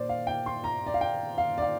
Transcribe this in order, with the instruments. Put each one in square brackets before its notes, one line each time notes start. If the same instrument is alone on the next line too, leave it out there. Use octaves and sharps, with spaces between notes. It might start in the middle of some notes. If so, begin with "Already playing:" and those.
Already playing: [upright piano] A#2 A#3 C5 D5
F5
G5
C6
A#5
D5
F5
G5
F5
D5
F5